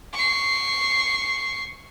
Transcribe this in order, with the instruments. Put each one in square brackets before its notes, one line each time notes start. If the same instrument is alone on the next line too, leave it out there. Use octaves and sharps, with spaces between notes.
[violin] C#6 C7